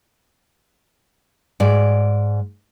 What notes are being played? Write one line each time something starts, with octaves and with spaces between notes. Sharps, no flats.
G#2 D5